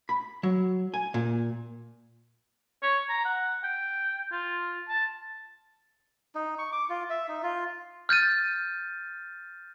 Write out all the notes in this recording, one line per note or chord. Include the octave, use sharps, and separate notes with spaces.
B5
F#3
G#5
A#2
C#5
A#5
F#5
G5
F4
A5
D#4
C#6
D6
F4
E5
D#4
F4
F6 G6 A6 D#7